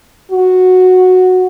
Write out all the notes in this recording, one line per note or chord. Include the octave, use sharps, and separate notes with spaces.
F#4